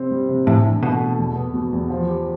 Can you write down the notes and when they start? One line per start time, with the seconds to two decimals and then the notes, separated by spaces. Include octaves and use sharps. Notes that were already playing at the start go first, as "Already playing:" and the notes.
Already playing: C3 C4
0.11 G3
0.29 C3
0.47 A2 E3
0.65 D4
0.83 B2 A3
1.01 A4
1.18 E2
1.36 B3
1.54 B2
1.73 E2
1.90 F3
2.08 G4